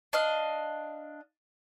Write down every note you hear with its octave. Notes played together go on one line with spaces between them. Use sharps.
D4 D#5 F5